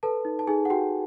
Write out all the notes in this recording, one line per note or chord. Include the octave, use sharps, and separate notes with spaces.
A4 B4 A5
D#4
A5
D#4 G#4 G#5
F#5
F#4 G4 G5